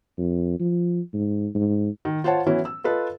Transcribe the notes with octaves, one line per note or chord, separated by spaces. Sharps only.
F2
F3
G#2
G#2
D#3
F4 C5 C#5 F#5 A5
E3 F#3 B3 C#4 E4
E6
F4 A4 B4 D#5